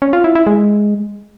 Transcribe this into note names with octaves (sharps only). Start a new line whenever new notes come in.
C#4
F4
E4
E4
G#3